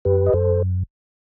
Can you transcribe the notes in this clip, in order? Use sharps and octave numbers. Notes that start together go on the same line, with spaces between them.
F#2 G4 B4
D#5
F#2 A4 C5